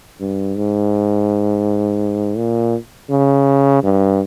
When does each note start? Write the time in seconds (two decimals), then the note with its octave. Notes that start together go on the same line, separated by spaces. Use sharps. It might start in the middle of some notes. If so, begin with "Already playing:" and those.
0.21 G2
0.57 G#2
2.37 A#2
3.10 C#3
3.83 G2